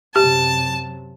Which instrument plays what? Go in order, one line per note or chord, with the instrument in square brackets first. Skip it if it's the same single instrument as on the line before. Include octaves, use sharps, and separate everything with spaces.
[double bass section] F#2 C3 F#3 [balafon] G4 [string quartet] A5